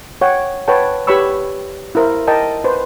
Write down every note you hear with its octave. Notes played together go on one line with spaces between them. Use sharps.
C#5 F#5 G5
B4 C#5 F#5 G5 A5
G4 B4 C#5 B5 C#6 E6
E4 A#4 C5
A#4 D#5 G5 A5
B4 C5